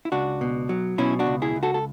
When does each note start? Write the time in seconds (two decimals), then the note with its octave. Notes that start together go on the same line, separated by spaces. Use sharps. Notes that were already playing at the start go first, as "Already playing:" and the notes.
0.05 E4
0.12 C#2 D4 F#4
0.41 B2
0.69 F#3
0.98 B2 C#4 E4
1.19 D4 F#4
1.27 C#2
1.42 E4 G#4
1.56 C#2
1.63 F#4 A4
1.74 A4